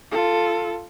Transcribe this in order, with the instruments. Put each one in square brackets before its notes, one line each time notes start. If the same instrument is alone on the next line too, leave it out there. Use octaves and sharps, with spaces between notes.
[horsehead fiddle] F4 A4